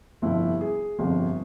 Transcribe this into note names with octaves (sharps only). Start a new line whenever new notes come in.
G1 F2 C3 E4
G#4
G1 F2 C3